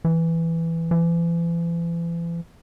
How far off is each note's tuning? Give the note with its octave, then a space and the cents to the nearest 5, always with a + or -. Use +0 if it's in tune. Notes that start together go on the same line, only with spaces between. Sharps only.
E3 +5
E3 +40